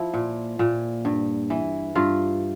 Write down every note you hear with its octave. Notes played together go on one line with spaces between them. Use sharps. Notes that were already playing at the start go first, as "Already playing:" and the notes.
Already playing: F3 E4
A#2
A#2
G2
E3
G2 F4